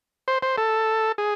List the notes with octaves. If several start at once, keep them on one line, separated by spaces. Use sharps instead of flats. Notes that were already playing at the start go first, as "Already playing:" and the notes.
C5
C5
A4
G#4